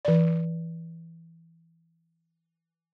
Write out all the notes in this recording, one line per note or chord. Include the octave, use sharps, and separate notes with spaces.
E3 D5